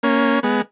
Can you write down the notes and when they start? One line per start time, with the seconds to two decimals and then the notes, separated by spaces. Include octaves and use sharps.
0.03 A#3 C#4
0.43 G#3 B3